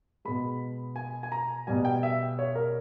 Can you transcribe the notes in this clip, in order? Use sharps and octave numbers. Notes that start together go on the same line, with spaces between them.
B2 G#3 B5
G#5
G#5
A#5
B2 G3 G#5
G5
E5
C#5
A#4